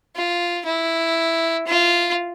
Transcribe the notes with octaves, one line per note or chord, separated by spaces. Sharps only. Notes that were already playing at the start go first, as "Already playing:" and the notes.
F4
E4
F4